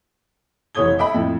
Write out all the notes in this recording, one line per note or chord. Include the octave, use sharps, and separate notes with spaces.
F1 E3 C#5 D#6 G#6 G7
D#5 E5 G5 B5
F2 A2